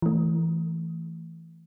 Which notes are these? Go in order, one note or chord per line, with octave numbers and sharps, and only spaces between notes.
E3 A3